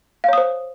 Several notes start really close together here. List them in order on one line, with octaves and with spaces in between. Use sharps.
F5 C#5 D#6 C5